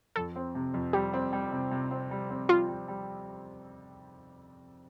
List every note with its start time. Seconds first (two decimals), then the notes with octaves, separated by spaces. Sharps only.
0.16 F2 A4
0.36 C4
0.55 C3
0.74 F2
0.93 G3 G4
1.13 C4
1.33 G3
1.52 C3
1.71 C3
1.91 C4
2.11 G3
2.30 C4
2.49 G3 F4
2.69 G3
2.88 G3